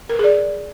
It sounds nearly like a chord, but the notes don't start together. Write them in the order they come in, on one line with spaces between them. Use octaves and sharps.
A#4 B4 G#4 D5